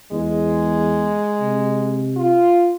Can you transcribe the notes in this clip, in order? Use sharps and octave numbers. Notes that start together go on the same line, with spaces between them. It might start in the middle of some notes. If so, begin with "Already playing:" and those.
E2 G#3
C3
F4